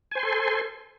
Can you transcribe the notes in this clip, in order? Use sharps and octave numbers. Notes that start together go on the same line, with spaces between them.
A4 C5 G#5 C6